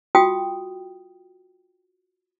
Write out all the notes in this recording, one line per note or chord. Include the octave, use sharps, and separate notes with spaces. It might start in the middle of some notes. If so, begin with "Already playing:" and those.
F4 F#4 G5 D#6